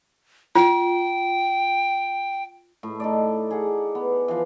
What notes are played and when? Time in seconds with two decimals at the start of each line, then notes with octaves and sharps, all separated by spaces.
0.55 F4 G5
2.83 A2
3.00 D#4 A4 D5
3.51 G#4 F#5
3.95 B3
4.28 E3 F3